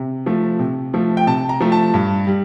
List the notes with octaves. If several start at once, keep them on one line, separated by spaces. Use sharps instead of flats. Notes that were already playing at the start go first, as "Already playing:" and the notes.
Already playing: C3
F3 A3
C3
F3 A3
G5
C3 A5
A#5
F3 A3
A5
G2
G3